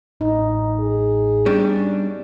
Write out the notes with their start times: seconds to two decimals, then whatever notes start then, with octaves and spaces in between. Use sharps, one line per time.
0.21 A1 D#4
0.80 G#4
1.46 G3 B3 C#4 D4